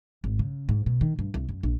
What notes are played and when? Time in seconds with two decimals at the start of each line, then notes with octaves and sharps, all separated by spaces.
0.24 G#1
0.39 C#3
0.69 G#2
0.86 B2
1.01 D#3
1.19 G2
1.34 C2
1.49 F#2
1.63 A#1